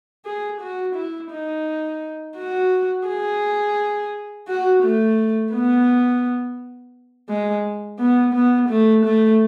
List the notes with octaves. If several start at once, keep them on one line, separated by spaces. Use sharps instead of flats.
G#4
F#4
E4
D#4
F#4
G#4
F#4
A3
B3
G#3
B3
B3
A3
A3